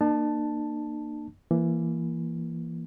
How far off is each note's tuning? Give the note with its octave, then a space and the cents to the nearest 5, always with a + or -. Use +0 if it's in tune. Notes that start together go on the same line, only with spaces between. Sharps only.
A#3 -5 D4 +45 A5 +0
E3 +25 A#3 +10